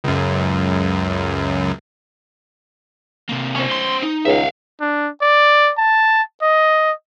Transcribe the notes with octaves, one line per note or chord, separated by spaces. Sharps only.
C#2 F#2
C3 A#3
C#4 C5
C6
D#4
C#2 E5 F5
D4
D5
A5
D#5